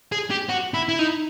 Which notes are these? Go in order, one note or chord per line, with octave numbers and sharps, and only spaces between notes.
G#4
G4
F#4
E4
E4
D#4